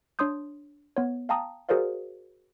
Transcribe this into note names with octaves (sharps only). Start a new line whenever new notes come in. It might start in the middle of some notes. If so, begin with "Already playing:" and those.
D4 C#5 C6 D#6 G6
B3 C#5
F5 G5 A5 A#5 D#6
F#4 G#4 A#4 C5 D5 F5